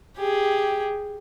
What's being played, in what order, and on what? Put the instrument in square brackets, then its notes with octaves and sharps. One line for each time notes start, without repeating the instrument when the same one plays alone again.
[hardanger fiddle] G4 G#4